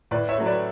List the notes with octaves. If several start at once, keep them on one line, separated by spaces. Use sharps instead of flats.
A2 B4 D5
C#5 E5
F#3 A3
B4 D5